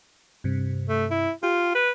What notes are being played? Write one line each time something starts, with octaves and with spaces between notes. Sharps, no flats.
G2 C3
A3
E4
F4 G4
B4